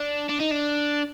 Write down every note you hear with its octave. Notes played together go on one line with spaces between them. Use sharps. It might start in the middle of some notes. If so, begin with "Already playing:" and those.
Already playing: D4
D4
D#4
D4